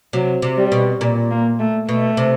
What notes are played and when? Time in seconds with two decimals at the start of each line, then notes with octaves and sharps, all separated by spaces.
0.13 C3 F#3
0.42 C3
0.57 G3
0.72 B2
1.01 A#2
1.31 A#3
1.59 A3
1.89 B2 A3
2.17 C3